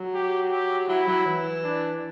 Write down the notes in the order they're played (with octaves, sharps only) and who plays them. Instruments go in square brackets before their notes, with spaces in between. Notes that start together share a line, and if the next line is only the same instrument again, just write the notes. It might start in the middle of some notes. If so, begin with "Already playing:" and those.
Already playing: [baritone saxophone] F#3
[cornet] G4
G4
[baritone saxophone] F#3 [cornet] E4
[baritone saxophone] F#3
E3
[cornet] D4